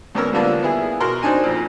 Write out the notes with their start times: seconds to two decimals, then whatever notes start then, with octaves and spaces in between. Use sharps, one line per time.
0.15 D2 G#2 B3 C#4 A#4 E6
0.33 D3 F3 G3 A#3 B3 D4
0.63 B3 E4 G#4
1.00 B2 A#4 C6
1.23 C4 D4 D#4 G#5
1.43 F2 A#2